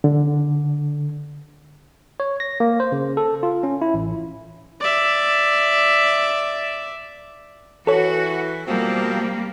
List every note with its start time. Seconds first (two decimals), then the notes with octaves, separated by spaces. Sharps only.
0.04 D3
2.20 C#5
2.40 A#6
2.60 A#3
2.80 C5
2.92 C#3
3.17 A4
3.43 F4
3.63 C#4
3.82 E4
3.94 A1
4.80 D5 E5
7.87 E3 F#4 A4 C#5
8.67 B2 F3 G3 A#3 C4